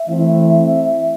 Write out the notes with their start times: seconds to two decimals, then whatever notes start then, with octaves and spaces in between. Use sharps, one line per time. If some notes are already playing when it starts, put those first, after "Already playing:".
Already playing: E5
0.08 E3 A3 C4 E4